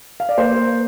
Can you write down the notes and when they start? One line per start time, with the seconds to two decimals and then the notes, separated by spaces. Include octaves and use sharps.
0.20 F5
0.29 D5
0.38 A#3 C5